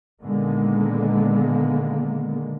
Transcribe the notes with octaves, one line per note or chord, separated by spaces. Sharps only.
A#2 D3 D#3 G#3 A#3 B3